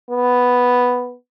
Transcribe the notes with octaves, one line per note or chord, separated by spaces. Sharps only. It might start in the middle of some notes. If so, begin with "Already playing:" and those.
B3